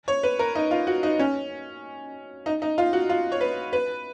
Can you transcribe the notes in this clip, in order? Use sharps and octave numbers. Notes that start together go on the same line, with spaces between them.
C#5
B4
A#4
D#4
F4
F#4
D#4
C#4
D#4
D#4
F4
F#4
F4
C#5
B4
B4